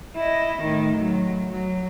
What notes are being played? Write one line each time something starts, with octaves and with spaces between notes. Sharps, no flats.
E4 D#5
A2 D#3
F#3
F#3